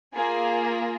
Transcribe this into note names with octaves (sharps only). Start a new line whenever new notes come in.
A#3 F4 G#4 G#5